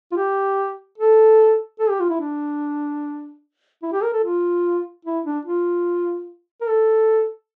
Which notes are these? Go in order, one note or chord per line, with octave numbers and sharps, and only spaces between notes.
F4
G4
A4
A4
G4
F4
E4
D4
E4
G4
A#4
A4
F4
E4
D4
F4
A#4
A4